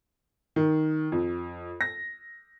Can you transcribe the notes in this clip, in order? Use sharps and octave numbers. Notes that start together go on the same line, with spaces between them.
D#3
F2
A#6